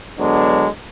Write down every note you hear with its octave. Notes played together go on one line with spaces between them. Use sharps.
D3 F#3 G#3 B3 D4